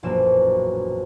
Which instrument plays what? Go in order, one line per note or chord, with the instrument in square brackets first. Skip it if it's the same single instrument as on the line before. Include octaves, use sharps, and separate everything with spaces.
[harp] E1 A#1 F#2 A#3 C4 E7